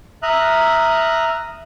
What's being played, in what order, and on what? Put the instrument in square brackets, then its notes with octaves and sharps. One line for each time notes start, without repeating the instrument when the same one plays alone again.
[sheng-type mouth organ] E5 A#5 D#6 F6 F#6